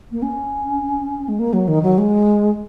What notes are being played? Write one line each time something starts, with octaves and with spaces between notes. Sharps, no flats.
A#3
C#4
G#3
A#3
F#3
D#3
F#3
G#3